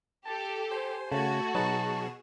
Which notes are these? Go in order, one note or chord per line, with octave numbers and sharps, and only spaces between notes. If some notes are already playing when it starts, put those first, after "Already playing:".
G4 A4 A5
C5 G#5
C#3 A3 F#4 A5 G#6
B2 F#3 D#4 G#4 B4 A5 E7